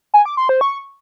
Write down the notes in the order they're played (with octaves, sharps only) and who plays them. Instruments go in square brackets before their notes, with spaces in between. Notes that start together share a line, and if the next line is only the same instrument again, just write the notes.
[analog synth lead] G#5
D6
C6
C5
C#6